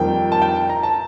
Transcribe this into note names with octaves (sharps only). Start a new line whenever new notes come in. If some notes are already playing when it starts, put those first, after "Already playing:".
Already playing: F2 D#3 G3 A#3 G5
A5
G5
A#5
A5